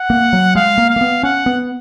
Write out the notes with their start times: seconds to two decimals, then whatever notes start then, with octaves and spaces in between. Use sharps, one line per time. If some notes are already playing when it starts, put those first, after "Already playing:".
Already playing: F#5
0.10 A#3
0.33 F#3
0.55 G#3 F5
0.78 A#3
0.90 F5
0.96 A#3
1.01 B3
1.23 C#4 F#5
1.46 B3